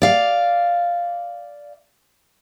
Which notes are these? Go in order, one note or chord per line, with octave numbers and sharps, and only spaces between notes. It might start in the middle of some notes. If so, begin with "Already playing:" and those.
D5 F5